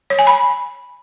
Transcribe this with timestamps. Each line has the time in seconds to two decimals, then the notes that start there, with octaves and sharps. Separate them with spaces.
0.10 C#5
0.19 G#5
0.27 B5